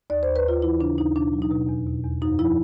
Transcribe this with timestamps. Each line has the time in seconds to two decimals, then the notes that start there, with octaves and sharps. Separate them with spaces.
0.10 D#2 D5
0.23 C5
0.28 D#2
0.36 B4
0.44 D#2 F4
0.62 E3 E4
0.80 C#3 D4
0.98 D#2 D#4
1.15 B2 D4
1.33 F#3
1.42 D#4
1.51 B2
1.69 E2
1.86 B2
2.04 E2
2.22 F#2 D#4
2.39 F3 E4